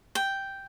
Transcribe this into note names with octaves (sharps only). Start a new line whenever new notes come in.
G5